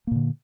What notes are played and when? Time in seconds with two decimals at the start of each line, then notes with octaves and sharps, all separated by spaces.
0.07 A#3
0.11 A#2
0.15 D3